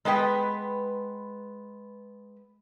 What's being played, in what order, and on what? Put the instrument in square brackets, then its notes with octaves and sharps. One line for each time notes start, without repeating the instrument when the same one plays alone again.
[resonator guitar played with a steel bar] G#3 B3 B4 G5